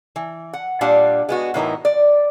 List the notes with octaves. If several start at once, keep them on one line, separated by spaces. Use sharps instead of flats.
E3
F#5
A#2 G3 D4 F5 F#5
G#3 B3 F#4
A2 E3 D#4 A#4
D5